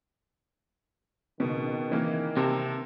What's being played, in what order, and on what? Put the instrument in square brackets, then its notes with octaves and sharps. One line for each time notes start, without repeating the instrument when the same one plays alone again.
[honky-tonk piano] C#2 B2 [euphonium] D#3
[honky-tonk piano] E3 A#3
[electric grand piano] C3 [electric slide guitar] C4 A#4 A5